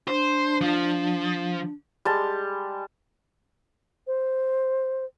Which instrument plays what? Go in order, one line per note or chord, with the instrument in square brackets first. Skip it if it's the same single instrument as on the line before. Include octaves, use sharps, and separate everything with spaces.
[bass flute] D4 [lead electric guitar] C5
[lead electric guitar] F3
[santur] G3 G#3 A5
[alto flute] C5